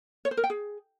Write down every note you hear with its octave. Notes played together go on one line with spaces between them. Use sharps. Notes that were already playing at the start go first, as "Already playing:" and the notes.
C#5
C5
A#4
G5
G#4